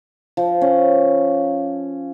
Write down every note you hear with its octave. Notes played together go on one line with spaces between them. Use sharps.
F3
C#4